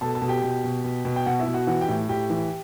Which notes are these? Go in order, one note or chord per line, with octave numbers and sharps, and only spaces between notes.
B2 A4 A5
A4 A5
B2
G4 G5
B2
B2
B2
B2
G5
B2 F#4 F#5
E4 E5
B2
F#4 F#5
E3 F#4 F#5
G4 G5
A2
A2 G4 G5
E3